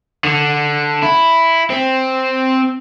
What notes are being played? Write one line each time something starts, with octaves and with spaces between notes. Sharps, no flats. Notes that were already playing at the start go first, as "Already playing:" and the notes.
D3
E4
C4